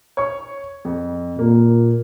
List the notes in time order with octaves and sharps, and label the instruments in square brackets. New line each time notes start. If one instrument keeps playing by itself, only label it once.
[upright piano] C#5 C#6
F2
[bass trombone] A#2 [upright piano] A#3